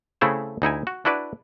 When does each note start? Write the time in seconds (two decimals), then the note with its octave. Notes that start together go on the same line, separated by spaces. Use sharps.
0.21 C#3 A3 C4 E4 G#4 A4
0.62 D2 D#4 E4 G#5
0.87 F#4
1.05 D4 E4 F#4 B4 D5